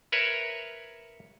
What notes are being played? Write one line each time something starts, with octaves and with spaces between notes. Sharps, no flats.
A#4 B4 C#5 E5